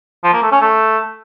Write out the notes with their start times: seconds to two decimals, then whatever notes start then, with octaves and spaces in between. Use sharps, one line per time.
0.24 F3
0.33 A#3
0.42 A3
0.52 C#4
0.61 A3